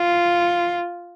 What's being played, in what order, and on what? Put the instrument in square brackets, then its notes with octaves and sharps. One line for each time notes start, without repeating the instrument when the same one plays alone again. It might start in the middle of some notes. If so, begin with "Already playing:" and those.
Already playing: [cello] F4